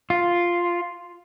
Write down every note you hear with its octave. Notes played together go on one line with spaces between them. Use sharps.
F4